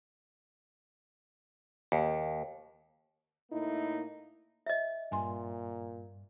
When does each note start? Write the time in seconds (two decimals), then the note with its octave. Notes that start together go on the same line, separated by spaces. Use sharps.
1.92 D#2
3.51 A2 A#3 D#4 E4
4.66 D#5 E5
5.12 G2 A#2 G#5 C6